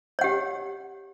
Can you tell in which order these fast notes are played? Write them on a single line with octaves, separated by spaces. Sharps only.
C#5 F#5 G4